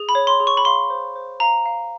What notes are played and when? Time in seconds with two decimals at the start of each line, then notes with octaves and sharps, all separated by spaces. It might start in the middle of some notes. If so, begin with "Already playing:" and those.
Already playing: G#4
0.09 B5
0.15 C#5
0.27 C6
0.40 G#4
0.47 C#6
0.57 B5
0.65 F5 C6
0.90 C5
1.16 C5
1.40 F5 A#5
1.66 F5